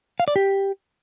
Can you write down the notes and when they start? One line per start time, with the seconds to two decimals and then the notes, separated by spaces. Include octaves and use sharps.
0.20 F5
0.28 D5
0.36 G4